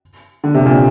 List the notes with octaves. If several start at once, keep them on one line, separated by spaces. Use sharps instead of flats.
D3
C3
A#2